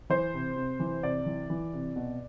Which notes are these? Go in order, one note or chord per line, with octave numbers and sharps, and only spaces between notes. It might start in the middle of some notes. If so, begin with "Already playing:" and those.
E3 C5
C3
C3
E3
C3 D5
E3
E3
C3
B2